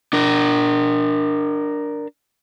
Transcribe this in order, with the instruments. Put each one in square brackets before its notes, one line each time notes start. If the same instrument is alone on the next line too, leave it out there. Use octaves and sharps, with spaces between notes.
[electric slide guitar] D4 A#4